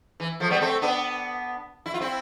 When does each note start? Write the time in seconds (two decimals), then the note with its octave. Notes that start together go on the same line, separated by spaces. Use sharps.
0.20 E3
0.40 F3 A3
0.50 G3 B3
0.61 A3 C4
0.82 B3 D4
1.86 E4
1.94 F4
2.00 C4 E4